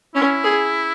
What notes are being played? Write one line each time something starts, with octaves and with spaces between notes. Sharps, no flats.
C#4 E4
G#4